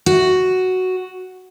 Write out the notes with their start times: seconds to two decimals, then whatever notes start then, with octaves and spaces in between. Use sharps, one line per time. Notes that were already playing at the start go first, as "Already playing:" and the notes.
0.06 F#4